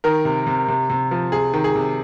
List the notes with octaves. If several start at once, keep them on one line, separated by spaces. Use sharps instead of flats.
D#3 A#4
C3
C3
C3
C3
F3
C3 G#4
D#3
G#4
C3